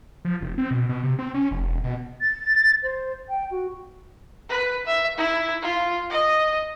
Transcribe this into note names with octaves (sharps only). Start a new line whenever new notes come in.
F3
F1
C4
B2
B2
C3
C4
C#4
F1
E1
B2
A6
C5
G5
F#4
B4
E5
E4
F4
D#5